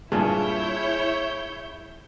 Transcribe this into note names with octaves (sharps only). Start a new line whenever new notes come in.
G2 A#2 E4 G#4 A4 C#5 G6